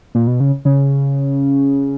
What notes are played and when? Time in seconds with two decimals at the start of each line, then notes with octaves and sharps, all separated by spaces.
0.15 A#2
0.27 B2
0.40 C#3
0.65 C#3